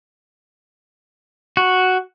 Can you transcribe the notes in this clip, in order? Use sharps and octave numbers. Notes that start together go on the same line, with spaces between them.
F#4